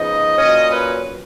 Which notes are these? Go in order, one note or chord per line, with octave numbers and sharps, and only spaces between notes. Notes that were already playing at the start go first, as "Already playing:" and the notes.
Already playing: C#3 F3 B3 D#4 D#5
A#2 F#3 C#4 D#5
B4